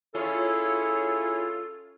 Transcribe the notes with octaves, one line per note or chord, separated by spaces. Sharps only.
C#4 E4 F4 G#4 A4 C#5